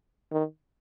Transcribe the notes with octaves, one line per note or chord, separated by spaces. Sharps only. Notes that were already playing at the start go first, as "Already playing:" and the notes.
D#3